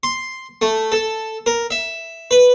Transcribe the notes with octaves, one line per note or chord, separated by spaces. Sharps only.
C6
A3
A4
A#4
E5
B4